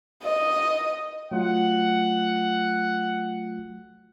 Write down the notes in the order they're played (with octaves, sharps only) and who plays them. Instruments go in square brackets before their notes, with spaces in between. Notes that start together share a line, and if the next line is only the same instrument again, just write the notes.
[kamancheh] D#5
[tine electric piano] F#3 A3 F4 [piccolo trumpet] F#5